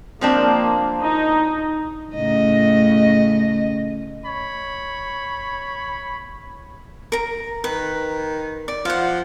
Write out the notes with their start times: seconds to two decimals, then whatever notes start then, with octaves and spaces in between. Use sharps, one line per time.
0.21 F3 A#3 C4 D4
1.02 D#4
2.15 A2 C#3 D#5
4.26 C#5 B5
7.12 A#4 A#5
7.64 D#3 B4
8.68 D5
8.85 F3 F5 F#5